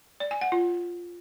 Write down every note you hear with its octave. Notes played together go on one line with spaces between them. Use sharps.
D5
G#5
F#5
F4